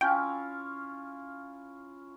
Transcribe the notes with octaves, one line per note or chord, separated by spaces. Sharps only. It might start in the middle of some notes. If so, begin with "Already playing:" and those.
C#4 E4 F4 G5